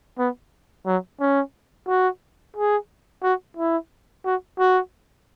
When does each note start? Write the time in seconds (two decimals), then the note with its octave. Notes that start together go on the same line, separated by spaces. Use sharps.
0.19 B3
0.86 F#3
1.20 C#4
1.88 F#4
2.57 G#4
3.23 F#4
3.57 E4
4.25 F#4
4.59 F#4